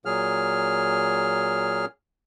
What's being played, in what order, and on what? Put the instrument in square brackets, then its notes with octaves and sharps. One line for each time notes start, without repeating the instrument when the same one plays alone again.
[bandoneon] A#2 F#3 G#4 F6